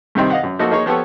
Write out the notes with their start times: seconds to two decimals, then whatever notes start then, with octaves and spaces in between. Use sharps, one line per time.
0.15 G2 C3 D#3 C4 D#4
0.30 D#5 F5 F#5
0.43 F#2
0.59 F3 A#3 D#4 F#4 A4
0.71 A#3 D#4 G#4 C#5
0.86 F3 B3 G4 A4 C#5